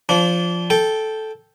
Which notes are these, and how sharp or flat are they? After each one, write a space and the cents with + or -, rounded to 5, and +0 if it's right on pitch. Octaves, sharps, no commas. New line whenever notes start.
F3 -5 D4 -25
A4 -10 G5 +0